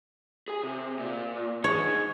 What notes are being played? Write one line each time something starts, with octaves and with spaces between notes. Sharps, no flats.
G#4 G#5
C3
A#2
D#4 G#4 C#5